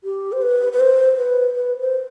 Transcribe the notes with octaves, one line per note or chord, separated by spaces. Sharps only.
G4
C5
B4
B4
C5
B4
B4
C5